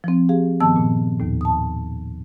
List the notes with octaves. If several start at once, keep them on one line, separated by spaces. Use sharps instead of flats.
F3 C4
G4 G#4 F5
G2 D#3 F3 B3 A5 E6
A#2
D#2 A2
A5 D#6